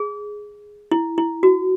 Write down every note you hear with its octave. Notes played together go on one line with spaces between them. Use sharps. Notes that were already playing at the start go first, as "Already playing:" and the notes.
Already playing: G#4
E4
E4
F#4